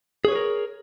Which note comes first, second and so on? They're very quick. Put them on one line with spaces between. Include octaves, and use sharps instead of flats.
G#4 C#5 B4 A#4